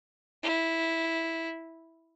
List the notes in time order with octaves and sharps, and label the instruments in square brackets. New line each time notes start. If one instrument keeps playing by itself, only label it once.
[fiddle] E4